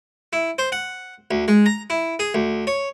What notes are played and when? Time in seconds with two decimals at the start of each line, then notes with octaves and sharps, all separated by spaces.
0.33 E4
0.58 C5
0.72 F#5
1.31 D2
1.48 G#3
1.66 A#5
1.90 E4
2.19 G#4
2.34 D2
2.67 C#5